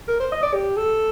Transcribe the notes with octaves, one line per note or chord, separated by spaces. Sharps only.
A#4
C5
D#5
D5
G4
A4